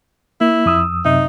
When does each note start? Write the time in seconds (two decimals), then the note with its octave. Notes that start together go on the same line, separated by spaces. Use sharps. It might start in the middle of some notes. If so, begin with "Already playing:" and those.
0.41 A#3 E4
0.66 F2 D#6 E6
1.05 F#2 C3 D#4 E5